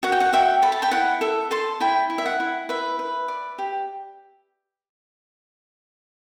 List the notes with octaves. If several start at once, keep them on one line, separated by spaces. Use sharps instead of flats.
F#4 F#5
G5
F#5
F#4 E5 G5
A4 B5
A5
G5 B5
E4 F#5
A4 E5
A4 A5 C6
E4 G5 B5
E4
E5
F#5
E4
B4 E5
B4
D5
G4